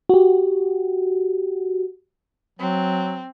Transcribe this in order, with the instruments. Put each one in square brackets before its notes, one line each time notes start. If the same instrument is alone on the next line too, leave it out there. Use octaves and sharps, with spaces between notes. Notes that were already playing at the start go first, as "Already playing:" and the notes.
[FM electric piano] F#4 G4
[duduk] F#3 [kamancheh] C4